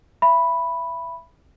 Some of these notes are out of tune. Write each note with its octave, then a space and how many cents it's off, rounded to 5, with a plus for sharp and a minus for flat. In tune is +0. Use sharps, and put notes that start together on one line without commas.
E5 +20 B5 +0